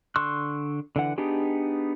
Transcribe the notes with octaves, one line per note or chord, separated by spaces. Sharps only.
D3 C6 C#6 E6 F#6
D3 E3 F#5
B3 D4 D#4 G4 G#4